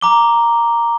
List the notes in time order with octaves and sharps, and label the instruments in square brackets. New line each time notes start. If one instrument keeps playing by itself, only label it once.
[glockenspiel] A#5 D6 G7